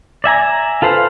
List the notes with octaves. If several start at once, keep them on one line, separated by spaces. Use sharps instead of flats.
D5 E5 G#5 A#5
F4 A4 B4 C5 F5